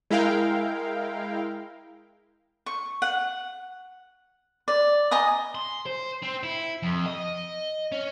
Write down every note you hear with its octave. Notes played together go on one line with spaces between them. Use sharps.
G#3 E4 A#4 F5 G5
C#6
F#5
D5
D#5 G#5 A#5 D#6
C6
C5
C4
E4
F2
D#5
C#4